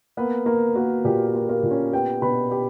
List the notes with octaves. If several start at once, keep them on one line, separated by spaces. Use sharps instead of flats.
A#3 B3 B4
A#3 A#4
A#3 F#4
A#2 G4
G4
A#3
A#3 A#4
A#2
C#4 C#5
B3 G4 G5
B2 B4 B5
B3 G4 G5